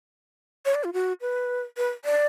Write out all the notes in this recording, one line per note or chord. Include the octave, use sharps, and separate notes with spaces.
C#5
D5
F4
F#4
B4
B4
D5